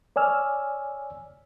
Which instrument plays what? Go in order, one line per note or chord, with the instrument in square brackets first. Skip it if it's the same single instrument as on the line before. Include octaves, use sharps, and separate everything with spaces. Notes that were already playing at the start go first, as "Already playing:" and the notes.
[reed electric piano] C#5 D5 G#5 E6 F6